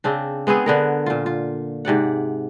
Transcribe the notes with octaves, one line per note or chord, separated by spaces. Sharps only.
C#3 C4 D4
G#3 B3 C4 G#4
D3 B3 A#4
A#2 F4
F4
G#2 C3 D5 F#5